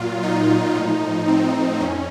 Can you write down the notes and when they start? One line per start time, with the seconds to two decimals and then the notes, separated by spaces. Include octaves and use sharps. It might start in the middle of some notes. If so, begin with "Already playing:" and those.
Already playing: A#2 F#3 F4
0.23 D#4
0.75 A2 F3
1.28 C4
1.80 F2 C#4